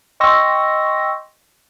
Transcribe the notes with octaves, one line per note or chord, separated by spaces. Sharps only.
D#5 G5 C6 C#6 E6 A#6